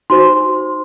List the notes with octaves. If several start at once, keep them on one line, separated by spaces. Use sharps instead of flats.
D#4 F#4 C5 C6